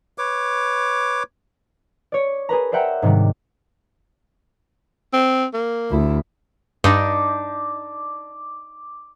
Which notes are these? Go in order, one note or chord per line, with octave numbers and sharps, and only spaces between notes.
B4 C#5 D6
C#5 D5
G#4 A#4 B4 A#5
C5 D5 E5 F#5 G5 A#5
G#2 C3 D#3 G3
C4
A#3
D2 E4
G2 D4 D#4 D6